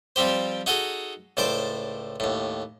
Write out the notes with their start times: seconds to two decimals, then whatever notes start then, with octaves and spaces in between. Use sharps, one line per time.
0.16 F3 G3 C4 G4 C5
0.66 D#4 F#4 G#4 A4 D#5
1.37 C#2 A2 C5 D5 A5 D6
2.20 D#2 A2